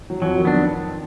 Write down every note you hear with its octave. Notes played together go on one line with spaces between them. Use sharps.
F#3
F2 F3 F#3
D#3
B3 D4